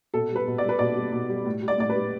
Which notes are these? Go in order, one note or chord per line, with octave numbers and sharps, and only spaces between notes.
B2 A4
G3 B4
B2
D5
G3 B4
B2 D5
G3
B2
G3
A2
G3
D5
A2 D5
B4
G3